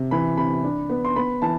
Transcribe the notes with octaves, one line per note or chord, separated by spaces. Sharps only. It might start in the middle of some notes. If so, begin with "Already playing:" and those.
Already playing: C3
E3 B5
C3 B5
D4
B3
C6
B3 B5
E3 A5